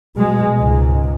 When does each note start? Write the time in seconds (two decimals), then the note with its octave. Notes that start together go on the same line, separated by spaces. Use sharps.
0.16 B2 G#3
0.59 C#2 G#2